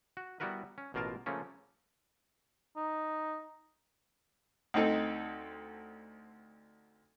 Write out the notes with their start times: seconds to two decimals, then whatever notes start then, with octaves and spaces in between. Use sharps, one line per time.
0.17 F#4
0.40 G3 B3 E4 F#4 A#4 B4
0.78 C#4
0.94 A1 B2 A#3 F4 A#4 A5
1.26 C#3 F3 A3 A#3 C#4
2.76 D#4
4.74 D2 C4 D#4 A4